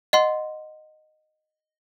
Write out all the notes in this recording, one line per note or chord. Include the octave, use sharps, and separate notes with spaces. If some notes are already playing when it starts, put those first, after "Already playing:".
D#5 F#5 C6